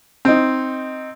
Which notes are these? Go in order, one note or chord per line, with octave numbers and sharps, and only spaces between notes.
C4 D#4